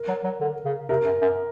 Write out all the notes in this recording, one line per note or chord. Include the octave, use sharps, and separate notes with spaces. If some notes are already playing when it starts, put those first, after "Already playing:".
Already playing: A#4
F#3
F#3
D3
C#3
C3 A#4
F#2
F#2